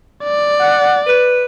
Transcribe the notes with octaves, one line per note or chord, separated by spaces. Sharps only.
D5
F#5
B4